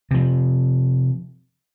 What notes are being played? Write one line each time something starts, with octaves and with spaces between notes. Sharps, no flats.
C3 F3